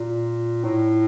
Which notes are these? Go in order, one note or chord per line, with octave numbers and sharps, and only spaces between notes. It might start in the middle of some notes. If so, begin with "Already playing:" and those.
Already playing: A#2
A2